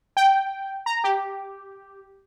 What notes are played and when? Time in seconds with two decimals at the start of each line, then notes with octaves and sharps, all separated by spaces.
0.17 G5
0.86 A#5
1.04 G4